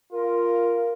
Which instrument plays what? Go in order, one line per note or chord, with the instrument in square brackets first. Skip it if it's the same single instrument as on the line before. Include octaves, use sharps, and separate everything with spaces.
[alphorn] F4 [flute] A#4